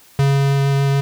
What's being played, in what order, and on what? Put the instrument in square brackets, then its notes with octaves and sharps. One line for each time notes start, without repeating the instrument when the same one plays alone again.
[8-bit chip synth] C#3